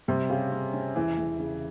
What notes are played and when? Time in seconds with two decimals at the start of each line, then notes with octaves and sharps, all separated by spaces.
0.08 C3 G3
0.30 C#3 G4
0.51 C#4
0.74 C#4
0.96 E1 E3
1.17 E1
1.39 C#3